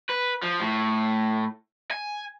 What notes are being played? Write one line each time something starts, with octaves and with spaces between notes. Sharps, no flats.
B4
F3
A2
G#5